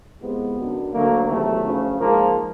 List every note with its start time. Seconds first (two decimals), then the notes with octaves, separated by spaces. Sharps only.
0.21 C2 C3 F3 G#3 B3
0.57 F#2 D3 F#3
0.93 D2 D3 F#3 A3 A#3
1.28 E2 C3 D#3 F#3 A3
1.64 D2 C#3 F3
1.99 G#2 F3 G#3 A#3